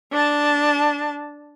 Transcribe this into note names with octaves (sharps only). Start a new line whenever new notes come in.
D4 A5